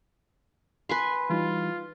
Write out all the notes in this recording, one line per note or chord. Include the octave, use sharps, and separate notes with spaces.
B4 G#5 C6
E3 G3 D#4 F4